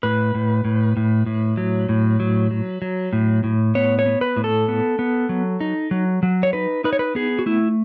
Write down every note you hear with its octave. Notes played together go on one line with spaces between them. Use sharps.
A2 B4
A2
A2
A2
A2
F#3
A2
F#3
F#3
F#3
A2
A2
B3 C#5
C#5
B3
B4
A2
A4
B3
B3
F#3
D#4
F#3
F#3
C#5
D#4 B4
D#4 B4
C#5
B4
B3 G#4
F#4
A3 E4